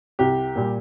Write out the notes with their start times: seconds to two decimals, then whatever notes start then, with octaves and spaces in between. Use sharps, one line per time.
0.19 C2 G4
0.56 A#2 G3